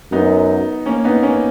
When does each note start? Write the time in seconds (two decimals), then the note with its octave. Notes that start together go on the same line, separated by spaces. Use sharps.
0.12 F#2 B3 D#4
0.86 A#3 C#4
1.04 B3 D#4
1.23 A#3 C#4